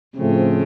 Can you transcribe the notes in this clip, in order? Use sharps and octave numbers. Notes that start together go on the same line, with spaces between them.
A2 C#3 F3 A3 C4